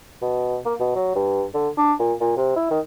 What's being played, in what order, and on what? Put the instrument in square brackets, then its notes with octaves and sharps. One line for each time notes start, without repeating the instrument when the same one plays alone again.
[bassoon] B2
A#3
B2
F#3
G2
D3
D4
A#2
A#2
C3
E4
D#3